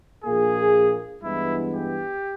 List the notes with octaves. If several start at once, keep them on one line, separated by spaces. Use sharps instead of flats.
A#1 A#2 A#3 G#4
G2 E3 G#3 B3 E4
G4